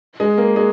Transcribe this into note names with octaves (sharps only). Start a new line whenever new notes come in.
G#3
A#3
G#3